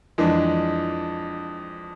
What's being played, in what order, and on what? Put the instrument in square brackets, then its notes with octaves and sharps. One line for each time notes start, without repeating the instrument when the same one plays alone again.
[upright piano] F2 E3 G#3 D4